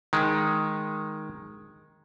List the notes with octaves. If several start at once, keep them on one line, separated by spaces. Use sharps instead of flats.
D#3 G#3